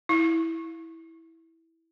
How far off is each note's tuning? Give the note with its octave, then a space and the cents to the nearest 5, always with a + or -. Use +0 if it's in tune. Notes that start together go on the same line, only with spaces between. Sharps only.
E4 -10